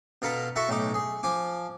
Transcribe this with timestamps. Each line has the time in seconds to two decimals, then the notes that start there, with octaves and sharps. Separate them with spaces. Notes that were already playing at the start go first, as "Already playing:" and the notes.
0.22 B2 F4 A4 A#5 B5
0.56 E4 F#4 A4 E5 C#6
0.69 B1 A2 D#4 D6
0.94 G#4
1.23 F3 G#5 D6